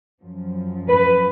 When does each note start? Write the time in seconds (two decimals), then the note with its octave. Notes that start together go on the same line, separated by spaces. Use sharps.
0.21 F#2 F3
0.89 B4